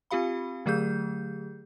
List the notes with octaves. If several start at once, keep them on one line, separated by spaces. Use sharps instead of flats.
C4 F4 G4 F5 B5
D3 F#3 A3 G4 G#4 G6